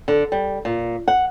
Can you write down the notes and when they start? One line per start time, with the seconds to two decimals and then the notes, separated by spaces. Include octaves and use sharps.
0.08 D3
0.32 G3
0.65 A#2
1.08 F#5